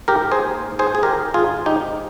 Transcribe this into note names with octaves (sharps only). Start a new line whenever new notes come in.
G#2 G4 A#4
G#4 C5
A#3
G#2
G#4 C5
G#4
D#3 G4 A#4
G#2 F4 G#4
G#2 D#4 G4